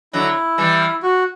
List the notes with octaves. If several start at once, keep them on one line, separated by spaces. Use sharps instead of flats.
D3 F#3 E4
E3 G3
F#4